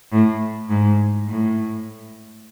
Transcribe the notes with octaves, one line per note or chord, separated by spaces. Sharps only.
A2
G#2
A2